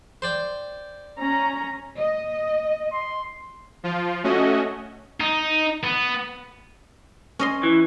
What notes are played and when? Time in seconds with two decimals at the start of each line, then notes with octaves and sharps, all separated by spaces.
0.22 C5 D5 G5
1.19 C#4 A#5
1.97 D#5
2.93 C6
3.83 F3 F4
4.24 A3 C#4 F#4 D#5
5.21 D#4
5.84 B3
7.39 C#4 D#5 C6
7.63 E3